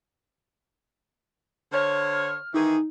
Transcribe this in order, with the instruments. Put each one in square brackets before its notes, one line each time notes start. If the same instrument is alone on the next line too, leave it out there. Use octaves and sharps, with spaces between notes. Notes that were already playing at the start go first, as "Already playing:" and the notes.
[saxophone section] D3 C5 C#5 [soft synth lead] F6
[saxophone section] D#3 E3 G#4 [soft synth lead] D#4